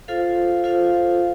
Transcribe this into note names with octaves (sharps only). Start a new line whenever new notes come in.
F4 A4 C5 F5
F4 A4 C5 F5